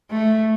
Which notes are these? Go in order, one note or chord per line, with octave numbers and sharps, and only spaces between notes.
A3